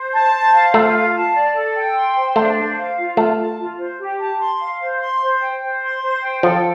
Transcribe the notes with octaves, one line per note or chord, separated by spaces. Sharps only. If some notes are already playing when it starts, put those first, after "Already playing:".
Already playing: C5
A5
C5
F5
A3 F4
F5
A5
D5
A4
G5
C6
C5
A3 D4
C5
F5
F4
A3 F4
A5
F4
C5
G4
A5
C6
F5
C5
C6
C5
G5
C5
C6
C5
G5
F3 A4